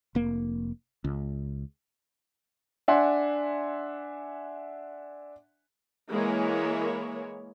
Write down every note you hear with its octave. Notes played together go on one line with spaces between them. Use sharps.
F1 A#3
C#2
D4 E5 F#5 G#5 C6
E3 G#3 A#3 E4 A#4 C#5